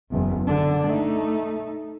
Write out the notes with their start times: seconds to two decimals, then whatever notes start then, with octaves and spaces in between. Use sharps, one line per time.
0.10 F#1 E2
0.47 D3 D4
0.88 A3 D#4